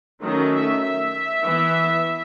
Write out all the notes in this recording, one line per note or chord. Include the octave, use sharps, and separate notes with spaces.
D#3 F#3 A3 C#4 D#5
E5
E5
E3 B3